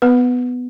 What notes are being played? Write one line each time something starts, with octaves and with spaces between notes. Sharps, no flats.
B3 B4